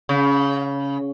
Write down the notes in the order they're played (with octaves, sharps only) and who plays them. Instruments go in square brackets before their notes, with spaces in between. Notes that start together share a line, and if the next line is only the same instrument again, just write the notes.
[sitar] C#3